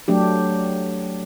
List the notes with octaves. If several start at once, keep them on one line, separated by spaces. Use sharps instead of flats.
F#3 A3 D4 G4